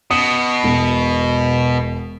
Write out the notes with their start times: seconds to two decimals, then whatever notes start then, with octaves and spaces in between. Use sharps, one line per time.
0.11 B2 D#6 C#7
0.64 E1